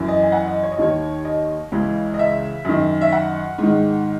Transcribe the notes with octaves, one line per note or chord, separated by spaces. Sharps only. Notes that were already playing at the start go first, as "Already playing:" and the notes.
Already playing: F#2 E3
D#5
G#5
F#5
D#5
C#5
D#5
D#2 D#3 C#5
D#5
C#2 C#3 E3
D#5
E5
F#2 D#3
E5
F#5
G#2 D#3